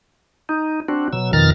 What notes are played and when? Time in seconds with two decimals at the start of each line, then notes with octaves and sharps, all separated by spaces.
0.49 D#4
0.88 C4 D4 F#4
1.13 B2 F#3 E6
1.33 F2 B2 D#3 A#5 F6 A6